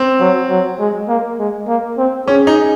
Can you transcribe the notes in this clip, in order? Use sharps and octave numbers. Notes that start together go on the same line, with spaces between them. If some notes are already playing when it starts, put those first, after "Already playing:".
Already playing: C4
F#3
F#3
G#3
A#3
G#3
A#3
C4
C#4 G#4
D#4